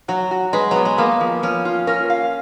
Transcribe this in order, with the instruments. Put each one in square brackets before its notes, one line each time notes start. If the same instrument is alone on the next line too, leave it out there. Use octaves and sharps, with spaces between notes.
[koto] F#3 [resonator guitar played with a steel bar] F#4
[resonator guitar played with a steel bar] F#4
[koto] G#3 [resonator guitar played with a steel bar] B4
[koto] F#3 [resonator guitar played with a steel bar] B3
[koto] G#3
[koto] A#3 [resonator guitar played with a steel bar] B3
[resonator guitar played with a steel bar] F3
[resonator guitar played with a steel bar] F3 [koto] C#4
[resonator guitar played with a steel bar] F4
[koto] C#4 [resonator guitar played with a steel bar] A#4
[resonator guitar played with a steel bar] F5